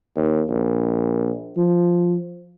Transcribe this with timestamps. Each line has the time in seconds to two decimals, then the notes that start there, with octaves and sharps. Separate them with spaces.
0.16 D#2
0.49 A#1
1.57 F3